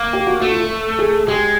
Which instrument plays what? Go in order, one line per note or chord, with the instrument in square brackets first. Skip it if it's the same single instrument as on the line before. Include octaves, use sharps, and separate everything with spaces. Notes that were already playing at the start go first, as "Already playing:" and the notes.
Already playing: [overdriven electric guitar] A#3
[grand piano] G4
F#4
[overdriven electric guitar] A3 [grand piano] F#4
[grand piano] F4
A4
G#4
[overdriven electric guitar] G#3 [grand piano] G4